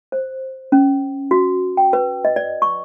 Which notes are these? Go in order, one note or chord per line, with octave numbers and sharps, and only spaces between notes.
C5
C#4
F#4
G5
B4
D#5
D5
C#6